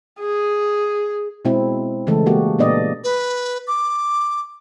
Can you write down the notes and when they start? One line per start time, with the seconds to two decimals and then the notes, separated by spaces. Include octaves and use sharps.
0.20 G#4
1.45 B2 G#3 C4 E4
2.07 C#3 E3 G#3 A3 A4
2.26 G#3 A#3 F#4 G4
2.59 A#2 B3 D4 D5 D#5
3.04 B4
3.67 D6